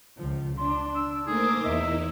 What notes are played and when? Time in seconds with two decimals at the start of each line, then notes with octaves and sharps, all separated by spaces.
0.17 C#2 F3
0.57 D4 C6
0.96 E6
1.27 A3 A#3 D#4 G#4 A#4 C5 D6
1.64 E2 D#4 E4 D#5 E5